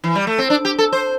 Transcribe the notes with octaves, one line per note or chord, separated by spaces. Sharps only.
E3
G3
A3
C4
D4
G4
A4
C5